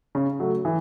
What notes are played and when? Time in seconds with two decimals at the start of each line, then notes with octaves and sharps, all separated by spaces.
0.15 C#3
0.40 F#3 A3
0.65 E3